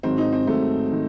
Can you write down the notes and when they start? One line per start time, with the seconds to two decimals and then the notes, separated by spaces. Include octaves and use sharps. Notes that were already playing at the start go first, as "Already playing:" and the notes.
0.03 G#2 D#3 F#3 C4
0.18 D#4
0.32 C4
0.47 G#2 D#3 F#3 A3
0.92 D#3